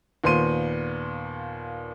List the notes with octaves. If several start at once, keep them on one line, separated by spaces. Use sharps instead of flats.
D#2 A#2 B3 C5 C6 D#7